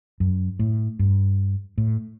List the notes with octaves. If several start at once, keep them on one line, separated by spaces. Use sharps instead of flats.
F#2
A2
G2
A2